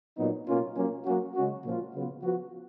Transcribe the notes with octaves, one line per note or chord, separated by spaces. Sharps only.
A#2 F#3 B3 D#4
B2 A#3 C#4 F4
F#3 A#3 C#4
F#3 A#3 C#4 F#4
C#3 G#3 C#4 F#4
A#2 F3 A#3 C#4 F4
C#3 F#3 B3 F4
F3 B3 F#4